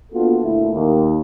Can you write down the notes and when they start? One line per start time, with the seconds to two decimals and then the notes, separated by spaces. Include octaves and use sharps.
0.13 A#3 B3 D4 F4 F#4 A4
0.43 D2 A#2 A3 E4
0.74 D#2